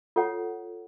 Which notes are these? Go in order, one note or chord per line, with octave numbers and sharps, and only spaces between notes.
F4 A4 C#5 F#5